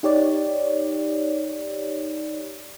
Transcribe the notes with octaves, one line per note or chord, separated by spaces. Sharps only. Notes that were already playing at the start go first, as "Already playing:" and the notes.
D#4 G4 C#5 D5